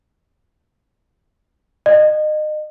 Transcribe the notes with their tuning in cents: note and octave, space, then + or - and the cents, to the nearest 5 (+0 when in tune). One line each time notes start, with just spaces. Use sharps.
D#5 -30